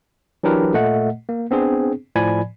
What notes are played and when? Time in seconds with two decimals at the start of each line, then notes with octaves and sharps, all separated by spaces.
0.43 E3 F#3 D4 G4 A#4 B4
0.74 A#2 A3 D#5 F#5
1.29 A#3
1.51 B3 C4 D4 G#4
2.16 A2 F3 D5 G#5 B5 G#6